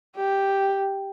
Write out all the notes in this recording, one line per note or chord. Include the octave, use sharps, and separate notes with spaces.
G4